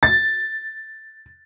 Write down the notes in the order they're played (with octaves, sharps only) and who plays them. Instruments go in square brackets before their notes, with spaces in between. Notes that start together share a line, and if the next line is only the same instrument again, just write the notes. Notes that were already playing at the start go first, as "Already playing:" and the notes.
[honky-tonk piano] A6